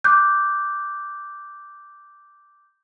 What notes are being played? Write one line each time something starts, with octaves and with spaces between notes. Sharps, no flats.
D6 F#6 G6